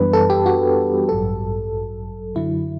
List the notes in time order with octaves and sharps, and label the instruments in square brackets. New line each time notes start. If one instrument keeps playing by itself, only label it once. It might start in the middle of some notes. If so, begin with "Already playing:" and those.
Already playing: [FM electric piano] F#2 E3 G3 B3 D4 B4
A4
G4
F#4
A1 G2 F#3 A4
F#2 D3 F#3 E4